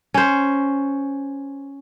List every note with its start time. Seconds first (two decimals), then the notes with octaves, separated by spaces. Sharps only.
0.14 C#4 C5